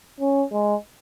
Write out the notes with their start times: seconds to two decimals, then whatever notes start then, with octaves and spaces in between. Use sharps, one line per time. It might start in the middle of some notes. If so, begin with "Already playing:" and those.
0.20 C#4
0.52 G#3